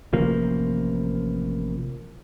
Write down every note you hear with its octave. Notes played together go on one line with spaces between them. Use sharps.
A1 C3 F3 A#3